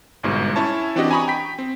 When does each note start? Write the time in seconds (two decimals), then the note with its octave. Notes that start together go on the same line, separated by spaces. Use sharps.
0.23 G1 G#2 B2
0.56 C#4 E4 C#5 A5
0.96 E3 C4 D4 F#4 G4 D#5
1.11 G#5 A#5 B5 C#6 D#6
1.28 G5 B6
1.59 C4